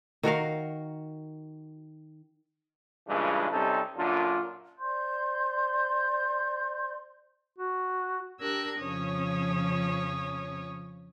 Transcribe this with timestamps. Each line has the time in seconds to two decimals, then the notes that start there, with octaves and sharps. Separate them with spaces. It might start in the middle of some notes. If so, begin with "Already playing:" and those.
0.23 D#3 F#4 A#4 F5
3.08 G2 A#2 C#3 E3 G#3
3.51 C3 G3 C#4 D#4 A4
3.97 F#2 A#2 D3 D4 F4
4.77 C5 D5 C6 G6
7.58 F#4
8.40 D4 G4 A#4 E6 F#6 G#6
8.78 F2 C#3 F3 C#4 C#5 D#6